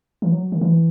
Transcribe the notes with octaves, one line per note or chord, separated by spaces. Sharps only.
E3
F#3
D#3
E3